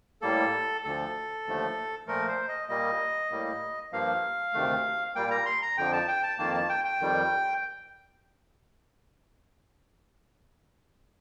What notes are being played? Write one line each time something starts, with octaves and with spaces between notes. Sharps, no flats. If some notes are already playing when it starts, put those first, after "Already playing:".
A2 G3 A#3 A4
D2 D3 F3 A4
D#2 D3 F3 A3
A#2 F3 A3 A#4
C5
D#5
A#2 G3 A#3 D#5
A2 G3 A#3
G2 F3 A#3 F5
D2 C3 D#3 A3
A#2 G3 A#3 G5
A#5
C6
A#5
F2 D3 F3 G5
A5
G5
A5
F2 D#3 A#3 A5
A5
G5
G5
F2 D#3 G3